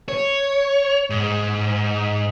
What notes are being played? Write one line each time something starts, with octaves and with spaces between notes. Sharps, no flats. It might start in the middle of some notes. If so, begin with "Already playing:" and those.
C#5
G#2